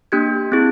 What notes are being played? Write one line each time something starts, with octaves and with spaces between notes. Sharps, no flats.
A#3 D4 G4 F#6 G#6
C4 E4 G#4